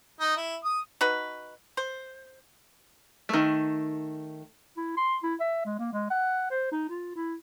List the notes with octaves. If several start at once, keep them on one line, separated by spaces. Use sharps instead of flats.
D#4
E4
D#6
D#4 F#4 B4
C5
D#3 A3
E4
C6
E4
E5
G#3
A#3
G#3
F#5
C5
D#4
F4
E4